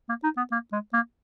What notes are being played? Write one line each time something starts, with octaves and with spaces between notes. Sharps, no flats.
A#3
D#4
B3
A#3
G#3
A#3